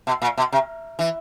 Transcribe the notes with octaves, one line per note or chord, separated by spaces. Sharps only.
B2
A#2
B2
C3
E3